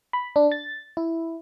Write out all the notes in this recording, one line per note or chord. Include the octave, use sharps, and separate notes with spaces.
B5
D4
A6
E4